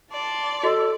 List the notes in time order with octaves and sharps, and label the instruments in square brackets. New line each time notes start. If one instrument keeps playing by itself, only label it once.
[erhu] D5 [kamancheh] A5 C6
[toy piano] F#4 D#5 [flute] A4